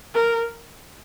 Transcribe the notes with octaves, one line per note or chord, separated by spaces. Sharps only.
A#4